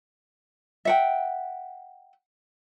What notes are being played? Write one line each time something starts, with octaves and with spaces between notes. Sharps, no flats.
E5 F#5 G5